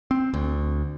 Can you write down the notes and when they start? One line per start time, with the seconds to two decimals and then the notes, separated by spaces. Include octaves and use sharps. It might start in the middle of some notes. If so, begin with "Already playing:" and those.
0.11 C4
0.34 D2